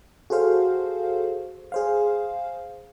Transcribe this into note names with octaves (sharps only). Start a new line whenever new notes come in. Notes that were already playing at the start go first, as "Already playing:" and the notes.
F#4 G#4 A4 C5 F5
G#4 C5 F5